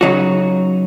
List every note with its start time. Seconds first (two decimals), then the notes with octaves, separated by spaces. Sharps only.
0.01 C#3 F#3 D#4 F#4